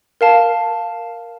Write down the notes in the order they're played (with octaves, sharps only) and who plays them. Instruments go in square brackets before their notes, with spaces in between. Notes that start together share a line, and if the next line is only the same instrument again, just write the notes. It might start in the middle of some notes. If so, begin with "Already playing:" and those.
[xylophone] A#4 F5 A5